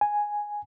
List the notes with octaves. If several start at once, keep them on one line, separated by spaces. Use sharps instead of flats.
G#5